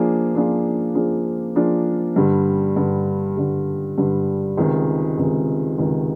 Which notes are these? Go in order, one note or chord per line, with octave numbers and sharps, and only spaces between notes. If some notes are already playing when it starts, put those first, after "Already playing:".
Already playing: F3 A#3 D4 F4 G#4
F3 A#3 D4 F4 G#4
F3 A#3 D4 F4 G#4
F3 A#3 D4 F4 G#4
G2 D3 G3
G2 D3 G3
G2 D3 G3
G2 D3 G3
C#2 C3 D#3 G#3
C#2 C3 D#3 G#3
C#2 C3 D#3 G#3